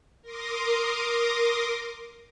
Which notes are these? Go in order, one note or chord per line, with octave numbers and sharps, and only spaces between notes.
A#4 A#5 C6 D6 D#6